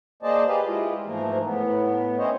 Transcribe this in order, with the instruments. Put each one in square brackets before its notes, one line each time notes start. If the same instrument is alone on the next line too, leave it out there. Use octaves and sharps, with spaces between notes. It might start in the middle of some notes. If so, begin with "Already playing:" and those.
[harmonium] A#3 G#4 C5 D5 D#5 A5
G4 G#4 B4 D#5 F5
G#3 E4 F4
G#2 E3 F3 A3 A#3 A#4
A2 B3
C4 C#4 E4 C5 C#5 D#5